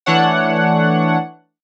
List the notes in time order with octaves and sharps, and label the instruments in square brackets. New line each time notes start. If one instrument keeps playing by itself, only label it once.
[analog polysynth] E3 A3 D4 C#5 F#5